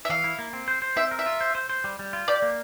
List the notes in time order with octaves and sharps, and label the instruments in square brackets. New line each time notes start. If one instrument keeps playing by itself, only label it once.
[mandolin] E5
[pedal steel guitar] E3 [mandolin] F5
[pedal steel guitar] E4
A#3
C4
C5
C5
[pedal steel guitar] C4 [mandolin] E5
[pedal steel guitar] A#4
[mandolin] E5
[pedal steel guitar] F4
C5
C5
C5
G3
G3
F4
[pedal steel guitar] G4 [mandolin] D5
[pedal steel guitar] A#3